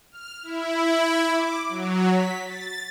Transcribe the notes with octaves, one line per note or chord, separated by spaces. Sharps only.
F6
E4
D6
F#3
B6
A6